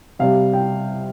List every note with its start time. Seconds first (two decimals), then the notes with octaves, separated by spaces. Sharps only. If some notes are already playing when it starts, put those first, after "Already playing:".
0.19 C3 G3 F5
0.53 G5